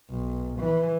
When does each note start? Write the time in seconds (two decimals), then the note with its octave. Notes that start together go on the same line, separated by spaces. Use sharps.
0.10 B1
0.60 E3